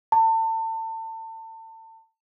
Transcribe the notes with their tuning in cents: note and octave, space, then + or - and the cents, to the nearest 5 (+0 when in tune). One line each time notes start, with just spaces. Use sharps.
A5 +30